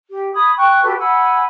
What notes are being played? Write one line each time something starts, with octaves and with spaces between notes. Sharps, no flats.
G4
B5 D#6 G#6
G5 C#6 F#6
F#4 G4 A4 B4
F#5 G#5 B5 E6